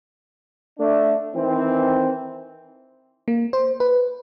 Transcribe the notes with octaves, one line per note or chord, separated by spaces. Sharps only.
A3 D4
D#3 E3 C4
A#3
C5
B4